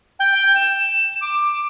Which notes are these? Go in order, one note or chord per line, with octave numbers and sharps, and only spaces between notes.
G5
E7
D6